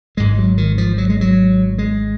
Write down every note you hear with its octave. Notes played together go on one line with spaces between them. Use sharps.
G#1 G#2 G#3
F#3
D#3
F3
F#3
G#3
F#3
G#3